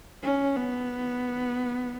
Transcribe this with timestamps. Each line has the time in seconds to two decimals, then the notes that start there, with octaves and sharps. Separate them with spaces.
0.23 C#4
0.56 B3